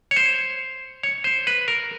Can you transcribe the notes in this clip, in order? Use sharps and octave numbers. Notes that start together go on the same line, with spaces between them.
C#5
C5
C#5
C5
B4
A#4